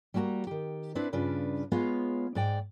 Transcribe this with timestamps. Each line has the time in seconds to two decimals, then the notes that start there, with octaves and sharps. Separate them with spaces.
0.14 G3 A#3 F#4 A5 A#5
0.47 D#3 G4
0.95 C4 D4 E4 B4
1.13 G2 C#3 D4 F4 B4
1.72 G#3 B3 F4 C#5 F5
2.35 G#2 D5 G5